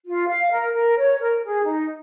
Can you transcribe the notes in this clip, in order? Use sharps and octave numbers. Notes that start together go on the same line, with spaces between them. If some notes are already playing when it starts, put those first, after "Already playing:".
F4
F5
A#4
A#4
C#5
A#4
G#4
D#4